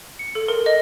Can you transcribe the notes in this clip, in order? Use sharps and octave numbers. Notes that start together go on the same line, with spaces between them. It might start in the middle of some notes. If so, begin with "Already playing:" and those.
C#7
A4
A#4
D#5